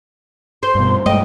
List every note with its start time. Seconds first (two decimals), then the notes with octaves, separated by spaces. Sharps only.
0.63 C5 C6
0.75 G2 B2
1.06 G2 G#3 A3 D#5 G5